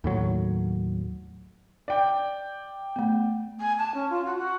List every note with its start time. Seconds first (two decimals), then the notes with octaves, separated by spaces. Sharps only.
0.04 D#2 A2 F#3
1.88 D5 G5
2.96 A3 B3
3.60 G#5
3.78 A5
3.94 C#4
4.10 F4
4.25 F#4
4.38 F#4